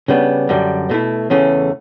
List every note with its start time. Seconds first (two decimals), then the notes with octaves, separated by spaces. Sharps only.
0.08 C#3 G3 B3 D4
0.49 F#2 D3 G3
0.89 B2 A3 E4
1.30 E2 C#3 E3 A3 C#4